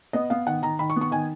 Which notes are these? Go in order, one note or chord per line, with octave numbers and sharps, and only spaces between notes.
B3 D#5
B3 F5
D#3 F#5
D#3 A#5
D#3 B5
C#6
B3
C#6
D#3 G#5